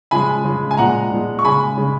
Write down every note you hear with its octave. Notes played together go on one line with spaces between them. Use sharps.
C#3 F3 G#3 G#5 B5
C#3 F3 G#3
G#5
A#2 F3 G#3 F#5 A#5
A#2 F3 G#3
C#6
C#3 G#3 G#5 B5
C#3 G#3